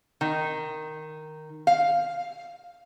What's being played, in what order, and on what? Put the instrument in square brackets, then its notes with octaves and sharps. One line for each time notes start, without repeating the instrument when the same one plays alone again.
[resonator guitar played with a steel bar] D#3
F5